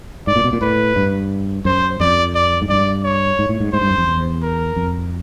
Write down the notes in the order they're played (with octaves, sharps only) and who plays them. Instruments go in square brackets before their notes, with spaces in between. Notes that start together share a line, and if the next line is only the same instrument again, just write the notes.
[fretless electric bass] G#2 [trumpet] D5
[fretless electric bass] A#2
B2
A#2
[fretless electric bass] A2 [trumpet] B4
[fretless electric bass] G2
[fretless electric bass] F#2 [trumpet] C5
[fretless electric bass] F2 [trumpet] D5
[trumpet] D5
[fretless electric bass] G#2
[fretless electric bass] G2 [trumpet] D5
[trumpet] C#5
[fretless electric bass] G#2
A2
G#2
[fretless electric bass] G#2 [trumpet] C5
[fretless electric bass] G2
F#2
F2
E2
[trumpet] A#4
[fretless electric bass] F2